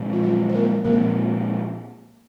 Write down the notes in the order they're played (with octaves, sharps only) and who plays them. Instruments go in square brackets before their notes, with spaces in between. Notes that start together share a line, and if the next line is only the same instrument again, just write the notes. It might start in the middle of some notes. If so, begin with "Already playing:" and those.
Already playing: [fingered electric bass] A#2 F3 G#3 C4
[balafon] F4
F#3 F#4
C5
A#3 A#4
[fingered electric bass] A#2 F3 G#3 C4 [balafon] A#3 A#4